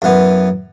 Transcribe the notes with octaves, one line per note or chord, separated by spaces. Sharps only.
F#2 E3 B3